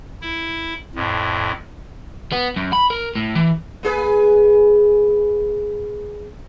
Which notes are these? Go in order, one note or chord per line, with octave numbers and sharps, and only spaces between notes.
E4
F2 A2
B3
F#2
B5
A#4
A2
E3
A#3 G#4 B4